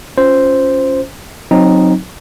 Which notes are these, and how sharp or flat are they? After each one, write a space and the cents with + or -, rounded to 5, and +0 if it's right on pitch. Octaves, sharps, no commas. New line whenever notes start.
C#4 +0 F4 +0 C5 -5
F#3 -15 C4 +10 D#4 +0